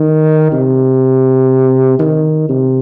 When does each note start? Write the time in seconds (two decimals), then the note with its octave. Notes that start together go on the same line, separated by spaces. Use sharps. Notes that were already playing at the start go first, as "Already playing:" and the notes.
Already playing: D#3
0.52 C3
1.99 D#3
2.49 C3